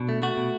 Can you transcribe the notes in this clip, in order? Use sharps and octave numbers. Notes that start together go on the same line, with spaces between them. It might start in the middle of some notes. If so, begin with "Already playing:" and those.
Already playing: B2 D4
A3
A3 F#4
B2